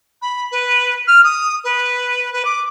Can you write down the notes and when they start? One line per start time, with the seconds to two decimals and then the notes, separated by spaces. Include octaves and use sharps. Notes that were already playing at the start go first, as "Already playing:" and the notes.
0.22 B5
0.52 B4
1.07 F6
1.24 D#6
1.64 B4
2.33 B4
2.45 D6